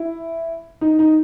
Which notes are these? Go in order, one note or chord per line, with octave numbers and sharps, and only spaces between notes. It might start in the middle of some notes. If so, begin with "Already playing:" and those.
Already playing: E4
D#4
D#4